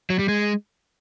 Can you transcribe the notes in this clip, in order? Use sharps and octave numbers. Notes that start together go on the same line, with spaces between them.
F#3
G3
G#3